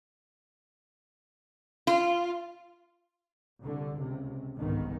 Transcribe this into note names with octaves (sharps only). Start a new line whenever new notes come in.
F4
C2 D3
C#2 C3
G1 C2 G#2 D#3 B3